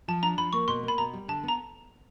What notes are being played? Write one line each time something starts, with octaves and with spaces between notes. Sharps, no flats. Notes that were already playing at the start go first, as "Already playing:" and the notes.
F3 A5
D4 A#5
F3 B5
A#3 C#6
B2 C6
A#3
B5
B2 A#5
G3
D3 A5
B3
A#5